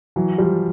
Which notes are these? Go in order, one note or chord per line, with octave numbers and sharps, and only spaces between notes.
E3 F#3
F3 G3